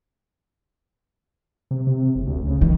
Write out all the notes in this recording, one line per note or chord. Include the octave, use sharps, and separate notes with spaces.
C3
C3
F#1
D2
C#3
D#3 E3